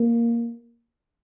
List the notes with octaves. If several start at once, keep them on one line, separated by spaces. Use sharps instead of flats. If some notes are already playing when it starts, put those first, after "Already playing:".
Already playing: A#3